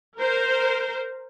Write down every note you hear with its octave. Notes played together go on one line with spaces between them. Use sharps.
A#4 C5